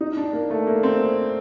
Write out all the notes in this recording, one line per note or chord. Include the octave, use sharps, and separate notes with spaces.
D#4
D4
A#3
A3
A#3
C4